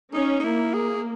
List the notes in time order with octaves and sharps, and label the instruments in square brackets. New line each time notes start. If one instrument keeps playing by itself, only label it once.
[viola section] C#4 [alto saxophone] D#4
[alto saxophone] D#4
[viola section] A#3 [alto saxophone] E4
[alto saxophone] G#4